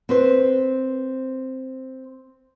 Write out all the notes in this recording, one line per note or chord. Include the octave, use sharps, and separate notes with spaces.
C4 B4 C5